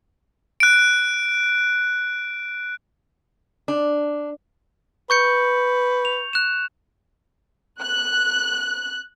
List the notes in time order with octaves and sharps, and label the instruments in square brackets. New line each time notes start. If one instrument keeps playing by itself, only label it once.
[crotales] F#6 D7
[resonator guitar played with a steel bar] D4
[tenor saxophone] B4 [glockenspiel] C#6 G6 C#7
[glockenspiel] F7
F#6 E7
[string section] F#6